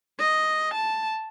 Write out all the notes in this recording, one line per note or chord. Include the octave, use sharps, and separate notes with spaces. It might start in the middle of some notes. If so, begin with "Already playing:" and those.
D#5
A5